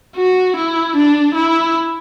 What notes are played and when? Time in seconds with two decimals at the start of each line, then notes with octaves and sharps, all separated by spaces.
0.15 F#4
0.56 E4
0.95 D4
1.35 E4